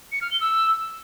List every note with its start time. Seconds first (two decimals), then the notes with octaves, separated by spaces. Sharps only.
0.12 C#7
0.22 F6
0.31 G7
0.41 E6